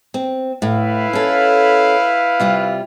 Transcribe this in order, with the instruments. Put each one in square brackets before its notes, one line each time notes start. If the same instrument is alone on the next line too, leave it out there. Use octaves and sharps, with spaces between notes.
[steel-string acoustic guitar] C4
[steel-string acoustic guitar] A2 [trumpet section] E4 B4 F5
[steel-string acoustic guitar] C#4 A4
C3 G3 F4